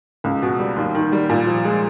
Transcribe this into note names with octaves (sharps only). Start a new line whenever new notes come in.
C#2
B2
G3
D#2
D#3
G3
A#2
F3
G#3